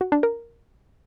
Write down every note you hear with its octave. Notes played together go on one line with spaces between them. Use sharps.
F#4
D4
A#4